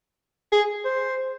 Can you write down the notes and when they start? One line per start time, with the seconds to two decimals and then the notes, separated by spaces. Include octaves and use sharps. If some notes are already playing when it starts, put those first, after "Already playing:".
0.52 G#4
0.85 C5